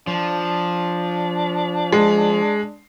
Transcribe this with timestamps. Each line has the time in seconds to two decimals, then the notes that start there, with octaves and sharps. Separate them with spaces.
0.07 F3 D4
1.92 G#3